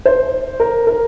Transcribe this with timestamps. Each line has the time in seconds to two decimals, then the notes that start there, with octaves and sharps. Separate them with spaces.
0.05 C5
0.60 A#4
0.87 A#4